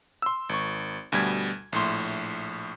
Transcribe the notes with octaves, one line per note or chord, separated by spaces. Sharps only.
C6 E6
G#1 C#6
D2 B2 G3 G#6
A#1 A2 C6